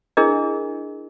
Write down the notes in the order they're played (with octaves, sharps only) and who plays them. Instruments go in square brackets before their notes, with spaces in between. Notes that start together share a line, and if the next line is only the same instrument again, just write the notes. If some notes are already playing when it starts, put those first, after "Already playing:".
[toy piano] D4 E4 G#4 A#4 D#5